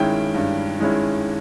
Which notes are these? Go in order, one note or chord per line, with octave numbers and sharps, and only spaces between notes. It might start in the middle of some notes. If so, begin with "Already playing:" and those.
Already playing: G2 D#3 G#3 C#4 E4 G5
G2
D#3 G#3 C#4 E4